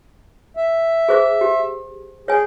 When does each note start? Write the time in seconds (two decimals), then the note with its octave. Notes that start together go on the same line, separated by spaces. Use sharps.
0.57 E5
1.09 G#4 C5 D6
1.41 G4
2.28 G#4 C#5 G#5